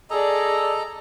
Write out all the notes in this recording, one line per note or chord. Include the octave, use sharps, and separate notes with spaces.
G#4 A4 D5 D#5 A#5